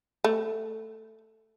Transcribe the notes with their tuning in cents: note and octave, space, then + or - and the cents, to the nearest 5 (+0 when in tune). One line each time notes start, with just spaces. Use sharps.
A3 +5